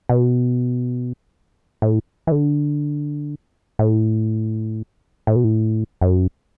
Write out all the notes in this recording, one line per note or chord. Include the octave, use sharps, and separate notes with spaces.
B2
A2
E3
D3
A2
A2
B2
A2
F#2